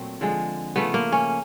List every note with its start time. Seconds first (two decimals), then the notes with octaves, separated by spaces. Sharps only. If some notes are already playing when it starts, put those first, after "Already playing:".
Already playing: A#2 F#3 A3 C4
0.21 D3 F3 G#3
0.76 C#3 F3 A3 B3
0.94 A#3
1.12 C#4